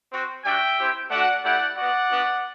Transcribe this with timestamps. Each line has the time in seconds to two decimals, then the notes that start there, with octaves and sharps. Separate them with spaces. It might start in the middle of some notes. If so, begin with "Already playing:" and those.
0.12 C4 F#4
0.45 G3 D4 F#4 E5 G5
0.78 C4 E4 G4
1.10 A3 D4 F#4 D5 F#5
1.44 A3 E4 G4 D5 F#5
1.77 B3 F#4 D5 F#5
2.10 B3 D4 F#4